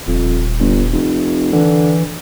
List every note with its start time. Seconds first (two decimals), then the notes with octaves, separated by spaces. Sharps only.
0.07 D#1 F2
0.60 G1
0.93 F1
1.53 D3 E3